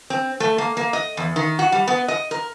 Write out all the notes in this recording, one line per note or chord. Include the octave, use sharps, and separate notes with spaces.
C4
A3
A#3
A#3
D#5
E2
D#3
F#4
G3
B3
D#5
A#4